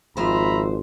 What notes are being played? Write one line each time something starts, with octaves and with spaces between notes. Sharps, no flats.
G#1 F2 C5 E5 A#5 B5